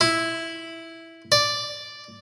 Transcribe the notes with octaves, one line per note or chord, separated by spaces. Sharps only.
E4
D5